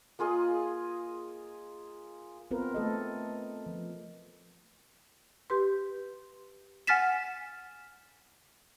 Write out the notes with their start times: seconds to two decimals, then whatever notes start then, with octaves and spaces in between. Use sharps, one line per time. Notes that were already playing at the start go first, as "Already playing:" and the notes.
0.19 A#3 F4 G#4 D#5
2.51 B3 C4 F4 A#4 B4
2.74 A3 A4 D#5
3.66 F3
5.50 G4 B4 C6
6.87 F#5 G#5 F6 A6 B6 E7